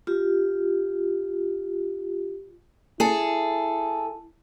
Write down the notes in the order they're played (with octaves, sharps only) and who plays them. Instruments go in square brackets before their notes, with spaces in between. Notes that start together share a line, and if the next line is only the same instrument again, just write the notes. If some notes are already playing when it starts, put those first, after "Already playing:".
[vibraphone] F4 G4
[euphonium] E4 [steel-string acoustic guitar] G#4 A4